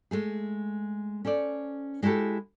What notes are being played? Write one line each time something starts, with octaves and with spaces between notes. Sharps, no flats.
G#3 A3 G#4
C#4 A4 C5 D5
G#3 E4 F#4 G4 A4